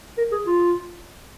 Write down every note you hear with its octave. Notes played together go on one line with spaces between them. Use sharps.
A#4
G#4
F4